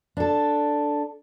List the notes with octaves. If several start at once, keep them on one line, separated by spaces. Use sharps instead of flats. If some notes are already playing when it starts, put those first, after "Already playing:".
D4 A4